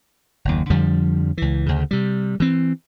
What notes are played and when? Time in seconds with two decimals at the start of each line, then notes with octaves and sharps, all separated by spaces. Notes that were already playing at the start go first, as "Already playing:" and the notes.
0.45 F#1 D#2
0.70 F2 D3 F3 G3
1.38 C#2 E3
1.66 D2 C#3
1.91 C3 G3
2.40 E3 C4